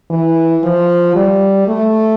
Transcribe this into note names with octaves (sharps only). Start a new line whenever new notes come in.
E3
F3
G3
A3